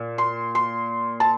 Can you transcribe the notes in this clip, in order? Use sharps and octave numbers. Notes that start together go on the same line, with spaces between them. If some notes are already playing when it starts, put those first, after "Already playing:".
Already playing: A#2
C6
C6
A5